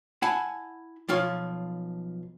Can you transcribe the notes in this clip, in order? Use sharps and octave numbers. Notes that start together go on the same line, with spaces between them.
E4 F#5 G#5 A5 B5
B1 F3 F4 C#5